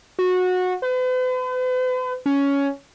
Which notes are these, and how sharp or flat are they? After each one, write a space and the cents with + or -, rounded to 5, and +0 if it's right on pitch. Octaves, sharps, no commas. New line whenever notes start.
F#4 -20
B4 +45
C#4 +10